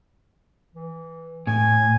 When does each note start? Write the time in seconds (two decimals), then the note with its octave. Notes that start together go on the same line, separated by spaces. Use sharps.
0.75 E3
1.47 A2 G#5